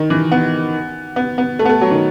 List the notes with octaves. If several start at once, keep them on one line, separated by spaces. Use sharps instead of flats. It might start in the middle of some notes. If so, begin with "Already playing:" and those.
Already playing: D#3
E3
B3
B3
B3
A3
B3
A3
F#3
D#3